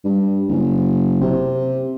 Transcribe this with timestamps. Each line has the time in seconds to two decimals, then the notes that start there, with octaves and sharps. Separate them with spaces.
0.05 G2
0.49 F#1
1.21 C3